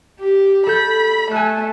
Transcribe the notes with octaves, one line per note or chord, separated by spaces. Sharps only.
G4
A4 B5 G6
A3 G#5 F#6